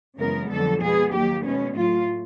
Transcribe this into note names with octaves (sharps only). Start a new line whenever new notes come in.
F#2 C#3 E3 G#3 B3 A#4
F2 D3 F#3 A4
B2 G#3 B3 G#4
D#2 D#3 F#3 A#3 G4
B2 G#3 B3 C#4
A2 F#3 A3 F4